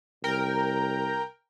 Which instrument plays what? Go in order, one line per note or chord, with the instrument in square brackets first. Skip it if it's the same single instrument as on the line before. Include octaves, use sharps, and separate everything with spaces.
[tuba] C2 [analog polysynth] A#4 G5